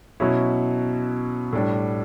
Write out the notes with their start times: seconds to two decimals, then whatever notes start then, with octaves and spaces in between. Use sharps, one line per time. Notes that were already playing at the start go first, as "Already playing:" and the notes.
0.20 B2 F#3 C#4 E4
1.52 A2 G3 D4